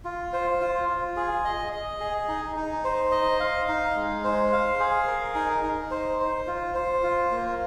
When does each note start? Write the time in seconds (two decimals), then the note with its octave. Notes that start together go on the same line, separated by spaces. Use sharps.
0.05 F4
0.33 C5
0.61 F4
0.89 F4
1.16 G#4
1.45 D#5
1.73 D#5
2.00 G#4
2.28 D#4
2.56 D#4
2.84 C5
3.11 D#5
3.40 F5
3.68 D#4
3.96 G#3
4.24 C5
4.52 F5
4.80 G#4
5.07 A#4
5.35 D#4
5.64 D#4
5.91 C5
6.19 C5
6.47 F4
6.75 C5
7.03 F4
7.31 A#3